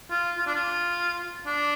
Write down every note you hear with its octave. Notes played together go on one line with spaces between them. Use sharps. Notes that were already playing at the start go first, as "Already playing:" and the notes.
F4
F4
D4
F4
D4